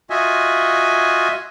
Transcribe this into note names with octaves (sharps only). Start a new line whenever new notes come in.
F4 F#4 D#5 E5 G#5